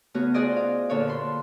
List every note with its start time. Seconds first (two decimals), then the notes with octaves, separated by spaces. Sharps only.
0.14 C#3 A3 B3 F#4 F6
0.34 F4 F#4 G#4 C5 D5 D#5
0.56 F5
0.89 A#2 D3 A4 C#5 F5
1.08 B5 C6